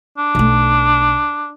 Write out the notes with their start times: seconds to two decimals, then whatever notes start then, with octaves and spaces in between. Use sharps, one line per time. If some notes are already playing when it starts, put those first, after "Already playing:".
0.18 D4
0.35 B1 A3